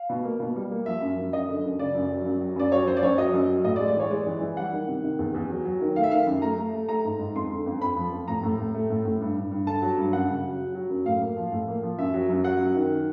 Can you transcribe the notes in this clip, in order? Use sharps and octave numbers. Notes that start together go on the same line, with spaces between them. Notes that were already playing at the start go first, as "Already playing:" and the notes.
Already playing: F5
B2
A#3
B2
G3
A#3
F3 E5
F#2
F#2
F#2 D#5
D3
F#2
C#3 D5
F#2
F#3
F#2
F#3
F#2 D5
F#3 C#5
F#2 C5
D5
F#2 C#5
F#3 D#5
F#2
F#3
A2 D#5
D5
G#3
D5
E3 C#5
G#3 D5
E3
E3
G3 F#5
D#3
C3
D#3
E2
E2
F#3
F#3
D#3
A3 F5
E5
D#3 F5
F#2
A3 A#5
A3
A3
A3 A#5
G#2
G#2
F2 C6
D3
F2
F2 B5
F3
F2
A2 A#5
A2
A2
A3
A2
A2
G2
G2
G2
D3 A5
F#3
G2
F#2 F#5
C#3
F#3
F#3
F#3
F#2
A2 F5
A#3
F3
A2
A#3
F3
F#2 E5
F#3
F#2
F#3 F#5
F#2
D#3